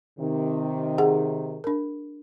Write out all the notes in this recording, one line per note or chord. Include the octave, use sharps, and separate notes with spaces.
C3 D#3
G#4 F#5
D4 A#4